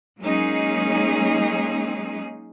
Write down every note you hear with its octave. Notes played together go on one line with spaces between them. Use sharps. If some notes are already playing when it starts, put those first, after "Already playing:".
F#3 G#3 A#3 C#4 D#4 G#4